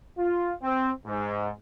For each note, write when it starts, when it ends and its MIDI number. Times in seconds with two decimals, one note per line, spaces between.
0.18 0.53 65
0.62 0.89 60
1.05 1.50 44